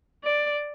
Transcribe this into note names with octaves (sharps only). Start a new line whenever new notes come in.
D5